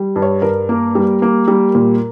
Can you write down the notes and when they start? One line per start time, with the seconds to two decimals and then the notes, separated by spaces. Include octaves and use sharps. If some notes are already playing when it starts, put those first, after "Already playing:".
Already playing: G3
0.16 G2
0.22 C#5
0.42 G2 A#4
0.69 A#3
0.95 G3
1.22 A#3
1.48 G3
1.75 A#2